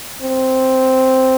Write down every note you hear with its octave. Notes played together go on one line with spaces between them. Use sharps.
C4